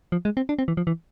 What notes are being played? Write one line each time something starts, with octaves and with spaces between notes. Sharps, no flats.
F3
G#3
C4
D4
C4
E3
F3
E3